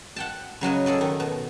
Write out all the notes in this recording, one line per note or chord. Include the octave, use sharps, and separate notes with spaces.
F#5 G5 A5
C#3 F#3 F#4 D#5
G#4 A4 D5 D#5
D#3
B2